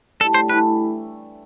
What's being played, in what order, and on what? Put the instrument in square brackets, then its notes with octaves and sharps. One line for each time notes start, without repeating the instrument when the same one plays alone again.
[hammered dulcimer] A2 G3 D4 G4 [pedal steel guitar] A4
[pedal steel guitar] C5
[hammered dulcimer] E3 A3 E4 [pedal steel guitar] B4